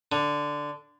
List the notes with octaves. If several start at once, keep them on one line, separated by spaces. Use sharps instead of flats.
D3